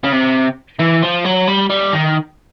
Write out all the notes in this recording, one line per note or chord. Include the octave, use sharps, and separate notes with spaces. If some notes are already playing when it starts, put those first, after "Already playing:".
C#3
C3
E3
F3
F#3
G3
G3
D#3